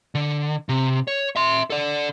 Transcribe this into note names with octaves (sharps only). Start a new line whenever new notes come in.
D3
C3
C#5
E5 C6
A4 D5